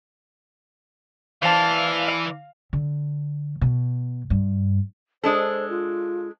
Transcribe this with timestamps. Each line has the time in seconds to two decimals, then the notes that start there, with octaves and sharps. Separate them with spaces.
1.43 E3 C5 D5 F5 A5
2.73 D3
3.61 B2
4.30 G2
5.24 G#3 D4 A4 C5
5.69 F4